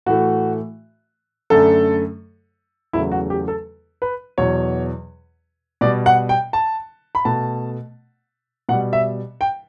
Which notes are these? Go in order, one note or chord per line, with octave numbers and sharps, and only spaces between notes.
A2 E3 A3 F#4
F#2 D3 A3 A4
E2 C#3 F#3 A3 E4
F#4
G4
A4
B4
E2 B2 F#3 C#5
B2 G3 D5
F#5
G5
A5
B5
B2 A3 A5
B2 G3 F#5
E5
G5